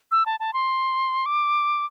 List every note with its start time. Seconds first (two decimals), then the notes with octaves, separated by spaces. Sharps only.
0.12 E6
0.26 A5
0.40 A5
0.53 C6
1.26 D6